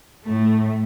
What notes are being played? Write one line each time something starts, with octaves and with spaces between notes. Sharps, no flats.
A2 A3